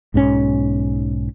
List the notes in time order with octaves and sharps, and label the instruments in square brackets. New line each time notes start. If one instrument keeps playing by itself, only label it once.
[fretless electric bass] B1 G#2 E3 C#4